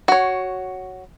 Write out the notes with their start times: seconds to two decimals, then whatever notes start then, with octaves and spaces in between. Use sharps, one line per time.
0.08 F#4 C#5